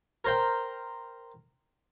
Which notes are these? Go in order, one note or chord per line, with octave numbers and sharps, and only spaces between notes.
A#4 C5 G5